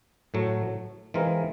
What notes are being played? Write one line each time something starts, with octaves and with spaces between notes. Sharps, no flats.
A2 F#3 A3
E3 G#3 C4 F4 A#4